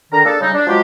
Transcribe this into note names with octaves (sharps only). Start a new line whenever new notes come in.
D3 D#3 A#5
A#3 D4 G#4 A4
C#3 G3 D#4
D4
F3 F#3 G#3 F4 G4